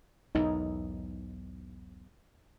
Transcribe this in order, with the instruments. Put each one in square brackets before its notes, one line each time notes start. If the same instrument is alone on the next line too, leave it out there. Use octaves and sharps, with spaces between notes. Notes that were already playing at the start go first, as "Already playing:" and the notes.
[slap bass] B1 E2 G#2 [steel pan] D#4